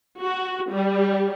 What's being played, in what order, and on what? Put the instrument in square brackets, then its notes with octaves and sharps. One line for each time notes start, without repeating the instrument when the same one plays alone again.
[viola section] F#4
G3